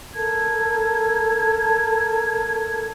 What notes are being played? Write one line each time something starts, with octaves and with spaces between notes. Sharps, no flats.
A4 A#4 A5 G#6